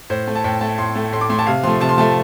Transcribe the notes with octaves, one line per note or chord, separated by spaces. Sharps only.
A2 C5
A3
A5
A2 G5
A3 A5
A2 C6
A3
A2 C6
D6
A3 C6
A5
C3 F5
F3 A3 C6
C3 A5
C6
F3 A3 A5